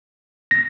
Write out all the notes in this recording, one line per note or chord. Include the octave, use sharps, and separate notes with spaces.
A#6